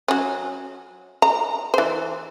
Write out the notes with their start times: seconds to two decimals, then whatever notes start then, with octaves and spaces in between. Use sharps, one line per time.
0.08 F#3 C#4
1.22 A#5
1.74 E3 C5